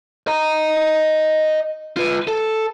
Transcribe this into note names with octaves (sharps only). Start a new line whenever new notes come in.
D#5 A#5
F4 B4
A4